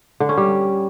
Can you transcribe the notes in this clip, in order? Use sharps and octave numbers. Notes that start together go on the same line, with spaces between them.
D3
C#4
G3